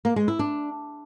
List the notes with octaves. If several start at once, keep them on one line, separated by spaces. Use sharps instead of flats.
A#3
G#3
E4
D4